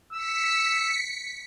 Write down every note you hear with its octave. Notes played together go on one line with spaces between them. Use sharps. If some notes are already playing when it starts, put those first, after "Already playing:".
E6 B6 C#7